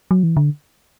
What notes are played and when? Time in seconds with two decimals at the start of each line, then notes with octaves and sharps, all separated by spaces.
0.11 F#3
0.23 E3
0.37 D3